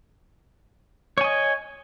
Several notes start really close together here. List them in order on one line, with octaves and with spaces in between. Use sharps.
C#5 G#5 D#5